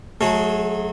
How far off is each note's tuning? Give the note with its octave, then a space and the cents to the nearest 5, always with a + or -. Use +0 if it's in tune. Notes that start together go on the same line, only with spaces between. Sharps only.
F#3 -20 A3 -35 G#4 +0